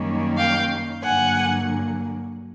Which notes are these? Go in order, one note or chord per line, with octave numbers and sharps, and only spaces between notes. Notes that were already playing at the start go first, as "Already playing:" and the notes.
Already playing: F#2 D#3 G3 A#3 C#4
F5 G5
G2 D3 F#3 A#3 F#5 G#5